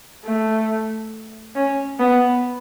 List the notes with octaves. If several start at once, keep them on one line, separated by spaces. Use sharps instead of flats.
A3
C#4
B3